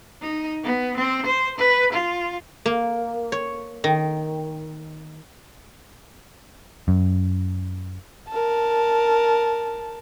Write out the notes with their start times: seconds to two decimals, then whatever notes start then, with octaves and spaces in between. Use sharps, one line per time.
0.22 D#4
0.63 B3
0.96 C4
1.26 C5
1.58 B4
1.92 F4
2.66 A#3
3.32 C#5
3.84 D#3
6.88 F#2
8.29 A#4 A5